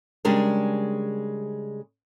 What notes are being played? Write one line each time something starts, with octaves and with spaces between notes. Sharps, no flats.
C#3 G3 G#3 D4 A#4